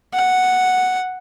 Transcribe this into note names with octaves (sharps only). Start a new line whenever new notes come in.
F#5